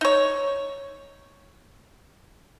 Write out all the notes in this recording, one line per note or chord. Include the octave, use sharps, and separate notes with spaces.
D#4 C#5